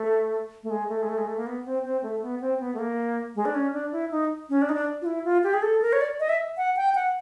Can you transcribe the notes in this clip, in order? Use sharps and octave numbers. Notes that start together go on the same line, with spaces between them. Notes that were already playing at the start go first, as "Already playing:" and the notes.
Already playing: A3
A3
G#3
A3
G#3
A3
G#3
A3
A#3
B3
C4
C4
A3
B3
C4
B3
A3
A#3
G#3
D4
C#4
D4
E4
D#4
C#4
D4
D#4
D4
F4
E4
F4
G4
G#4
A4
A#4
C#5
D5
D#5
E5
F#5
G5
F#5